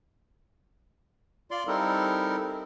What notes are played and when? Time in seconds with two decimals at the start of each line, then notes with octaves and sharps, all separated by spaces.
1.51 F4 D5 C6
1.67 G3 C4 D#4 E4 A4 A#4